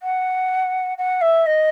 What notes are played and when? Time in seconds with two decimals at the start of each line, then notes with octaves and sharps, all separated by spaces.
0.02 F#5
0.97 F#5
1.21 E5
1.46 D#5